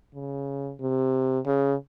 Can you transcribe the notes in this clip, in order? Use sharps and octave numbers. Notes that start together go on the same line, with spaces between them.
C#3
C3
C#3